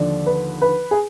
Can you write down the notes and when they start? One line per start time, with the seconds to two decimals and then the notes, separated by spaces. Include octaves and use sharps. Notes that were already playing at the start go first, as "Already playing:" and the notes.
Already playing: D#2 D3 F3 D5
0.26 B4
0.61 B4
0.91 G#4